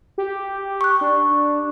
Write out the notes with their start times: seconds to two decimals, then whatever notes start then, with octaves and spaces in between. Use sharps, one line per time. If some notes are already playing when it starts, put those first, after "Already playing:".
0.18 G4
0.81 C#6 F#6
1.01 D4